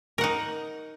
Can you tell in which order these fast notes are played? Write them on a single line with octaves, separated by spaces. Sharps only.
A#4 F#5 D#4